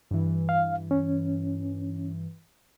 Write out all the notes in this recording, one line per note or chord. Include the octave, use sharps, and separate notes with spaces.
G2 E3
F5
C#4